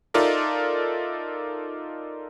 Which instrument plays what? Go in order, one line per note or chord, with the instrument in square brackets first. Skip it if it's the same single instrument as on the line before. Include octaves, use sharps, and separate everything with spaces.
[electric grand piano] D#4 F4 A4 A#4 D5 E5